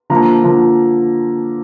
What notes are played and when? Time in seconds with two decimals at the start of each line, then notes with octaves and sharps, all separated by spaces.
0.10 D3 F3 A#3 A#5
0.44 D3 F3 A#3